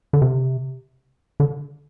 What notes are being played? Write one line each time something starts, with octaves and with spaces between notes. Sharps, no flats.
D3
C3
D3